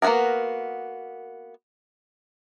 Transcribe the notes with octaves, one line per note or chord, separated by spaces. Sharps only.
A#3 B3 F#4 G#4 A#4